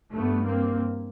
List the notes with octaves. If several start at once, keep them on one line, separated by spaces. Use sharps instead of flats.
G2 A3 B3
A#3 C4